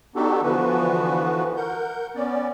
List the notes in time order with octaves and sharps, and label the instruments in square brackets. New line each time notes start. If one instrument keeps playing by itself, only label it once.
[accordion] B3 D4 D#4 F#4 G4 A4
D3 E3 F3 B3 F#4 B4
A#4 F#5 G6
B3 C#4 D5